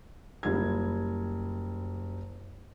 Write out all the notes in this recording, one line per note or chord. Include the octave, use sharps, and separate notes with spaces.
F#1 G3 F4 G#6